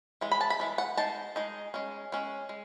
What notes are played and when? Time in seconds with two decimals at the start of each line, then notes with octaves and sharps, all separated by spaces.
0.21 E3 G#3
0.32 B5
0.41 A5
0.50 B5
0.60 E3 G#3
0.78 F#5
0.97 G#3 D#4 A5
1.36 G#3 D#4
1.74 G#3 C#4
2.12 G#3 C#4
2.49 G#3